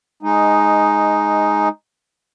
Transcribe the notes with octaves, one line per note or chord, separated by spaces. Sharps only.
G#3 D#4